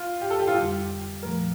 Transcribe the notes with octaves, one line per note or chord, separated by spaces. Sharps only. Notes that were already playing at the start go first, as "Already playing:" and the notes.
Already playing: F4
G4
A4
G4
F4
F2 D3 G3 G4
A#2 F3 A3 A#4